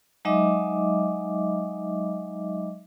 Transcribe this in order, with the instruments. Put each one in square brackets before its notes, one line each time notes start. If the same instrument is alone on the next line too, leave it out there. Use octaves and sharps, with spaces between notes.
[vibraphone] F#3 G#3 D#4 D#5 E5 D6